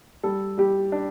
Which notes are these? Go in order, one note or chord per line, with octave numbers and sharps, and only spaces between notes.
G3 A4
G3 G4
D4